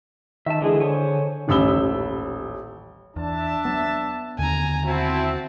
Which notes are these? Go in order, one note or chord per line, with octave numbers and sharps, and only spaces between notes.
D#3 E5 A5
D3 E3 G#3 G#4
C5 C#5 G#5
D#1 A1 B5 E6 G7
E2 D4 E5 A5
F#3 B3
D#2 D3 G#5 A#5
C4 E4 F#4 A5